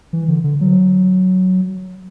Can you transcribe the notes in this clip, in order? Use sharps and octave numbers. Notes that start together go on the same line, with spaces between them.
E3
D3
D3
F#3